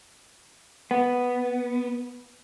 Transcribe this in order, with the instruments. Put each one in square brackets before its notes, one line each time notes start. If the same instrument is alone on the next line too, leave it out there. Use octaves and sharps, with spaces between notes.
[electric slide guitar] B3